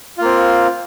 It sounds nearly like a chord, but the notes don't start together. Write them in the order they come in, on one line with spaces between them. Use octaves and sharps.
F4 A#3 C4